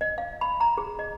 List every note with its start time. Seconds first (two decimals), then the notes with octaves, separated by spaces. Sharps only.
0.01 D#5
0.18 F5
0.41 B5
0.60 A#5
0.78 G#4
0.99 D#5